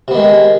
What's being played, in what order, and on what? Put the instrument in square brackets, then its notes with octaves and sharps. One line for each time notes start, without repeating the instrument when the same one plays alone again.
[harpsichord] C3
B3
D#3
G#3